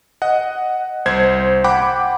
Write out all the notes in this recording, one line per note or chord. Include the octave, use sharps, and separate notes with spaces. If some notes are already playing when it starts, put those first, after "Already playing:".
D#5 F#5
C2 C5 G#6
F#5 G5 B5 D6